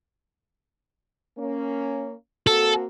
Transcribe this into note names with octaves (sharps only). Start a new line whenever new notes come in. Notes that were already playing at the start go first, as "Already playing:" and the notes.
A#3 C#4
A#3 C4 F#4 A4